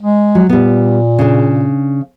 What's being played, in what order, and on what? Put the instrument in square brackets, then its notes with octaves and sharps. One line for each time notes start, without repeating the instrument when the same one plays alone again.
[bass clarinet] G#3
[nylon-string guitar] F#3
[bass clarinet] A#2 [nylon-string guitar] G3 B3
[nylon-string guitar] C#3 D4